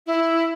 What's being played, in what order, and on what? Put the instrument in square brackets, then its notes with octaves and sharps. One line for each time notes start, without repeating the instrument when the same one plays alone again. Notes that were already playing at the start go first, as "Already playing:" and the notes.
[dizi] E4